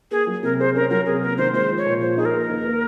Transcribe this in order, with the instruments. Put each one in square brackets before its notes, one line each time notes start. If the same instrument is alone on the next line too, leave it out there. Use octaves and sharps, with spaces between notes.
[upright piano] A#3 [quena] G#4
[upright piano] F#3
[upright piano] C3 [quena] A#4
[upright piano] G#4 [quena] C5
[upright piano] C#4 [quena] A#4
[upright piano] F#3 [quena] A#4
[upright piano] C3 [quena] G#4
[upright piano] A#3 [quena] A#4
[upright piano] D#3 [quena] C5
[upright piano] G#3 [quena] C5
[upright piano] F3
[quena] C#5
[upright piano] A#2
[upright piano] F3 [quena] C5
[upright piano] D#4 [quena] G#4
[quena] A#4
[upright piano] A#3
D#2
A#3